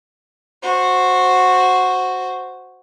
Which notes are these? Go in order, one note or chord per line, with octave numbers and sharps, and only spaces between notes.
F#4 C5